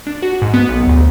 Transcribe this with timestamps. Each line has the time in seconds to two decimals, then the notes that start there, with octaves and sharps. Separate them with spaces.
0.07 D4
0.22 F#4
0.42 G#2
0.54 B3
0.68 B1
0.87 D2